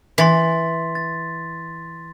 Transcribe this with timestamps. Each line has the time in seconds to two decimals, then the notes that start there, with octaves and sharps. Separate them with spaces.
0.18 E3 C6 A6 B6
0.95 A6